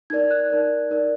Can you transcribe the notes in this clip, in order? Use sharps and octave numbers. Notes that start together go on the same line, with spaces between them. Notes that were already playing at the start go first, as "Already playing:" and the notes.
D#4 A#4 D5 G#6
F#6
D#4 A#4 D5
D#4 A#4 D5